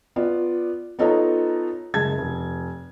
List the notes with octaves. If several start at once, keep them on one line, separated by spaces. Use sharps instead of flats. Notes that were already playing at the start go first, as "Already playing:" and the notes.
B3 F4 D5
B3 D#4 F4 A4 C#5 A#5
F#1 G#3 A5 G#6
F1